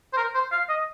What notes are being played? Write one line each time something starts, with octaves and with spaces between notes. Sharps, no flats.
C5
A#4
C5
F5
D#5